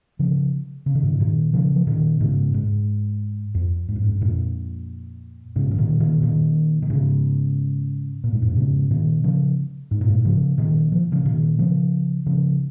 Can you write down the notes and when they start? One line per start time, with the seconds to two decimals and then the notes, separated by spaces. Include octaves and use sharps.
0.19 C#3 F3
0.86 C#3
0.95 D#3
1.03 G#2 C#3
1.20 A#2 D#3
1.53 C#3 F3
1.76 F3
1.87 A#2 D#3
2.20 G#2 C#3
2.54 G#2
3.55 F2
3.89 G#2
3.96 F2
4.04 G#2
4.21 F2 A#2
5.56 G#2 C#3
5.71 C#3
5.78 A#2 D#3
6.00 A#2 D#3
6.23 A#2 D#3
6.82 D#3
6.90 G#2 C#3
8.24 A#2
8.33 G#2
8.42 F2 A#2
8.57 G#2 C#3
8.91 A#2 D#3
9.24 C#3 F3
9.91 G#2
10.01 A#2
10.10 G#2
10.25 C#3 F3
10.58 A#2 D#3
10.92 F3
11.12 C#3 F3
11.25 A#2 D#3
11.59 C#3 F3
12.26 C#3 F3